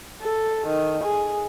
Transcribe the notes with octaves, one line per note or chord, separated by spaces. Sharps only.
A4
D#3
G#4